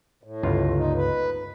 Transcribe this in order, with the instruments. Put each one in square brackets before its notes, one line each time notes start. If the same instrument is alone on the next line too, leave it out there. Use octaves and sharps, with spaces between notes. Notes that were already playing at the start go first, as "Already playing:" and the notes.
[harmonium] A2
[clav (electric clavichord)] G1 C#2 F4
[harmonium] A#2 D#4
B4